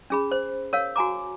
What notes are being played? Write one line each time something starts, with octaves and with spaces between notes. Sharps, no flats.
C#4 G#4 B5
C5
A#4 C#5 F5
F#4 G#5 A#5 D6